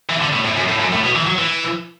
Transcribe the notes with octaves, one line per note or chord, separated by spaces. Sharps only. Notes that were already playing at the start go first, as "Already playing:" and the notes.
E3
D3
A2
A2
F#2
A2
F#2
A2
B2
E3
F#3
E3